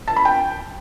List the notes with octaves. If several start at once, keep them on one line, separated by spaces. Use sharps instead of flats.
A5
B5
G5